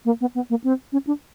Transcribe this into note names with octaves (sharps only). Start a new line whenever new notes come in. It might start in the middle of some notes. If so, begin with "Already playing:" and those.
A#3
B3
B3
A#3
C4
C#4
D4